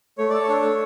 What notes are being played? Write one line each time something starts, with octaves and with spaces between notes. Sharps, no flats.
A3 C#5
A4 D5
C#5
D4
A3